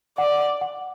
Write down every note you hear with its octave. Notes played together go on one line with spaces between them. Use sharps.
D5 F#5
F#5